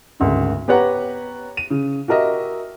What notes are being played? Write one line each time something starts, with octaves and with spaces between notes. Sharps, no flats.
G#1 D2 C#3
B3 G4 B4 C#5 F#5 A#5
D#7
C#3
F#4 G4 A#4 D#5 E5